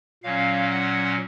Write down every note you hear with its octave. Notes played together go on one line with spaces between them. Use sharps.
A#2 F#3 C#4 F5
F#5